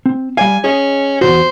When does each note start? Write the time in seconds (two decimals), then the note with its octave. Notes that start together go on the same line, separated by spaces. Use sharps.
0.06 C4
0.37 G3 D5 F5 G#5
0.64 C#4 G#4 D#5
1.21 E2 C3 F#4 C5